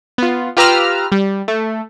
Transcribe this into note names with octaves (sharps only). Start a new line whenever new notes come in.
B3 F4
F4 G4 B4 A#5 E6 F6
G3
A3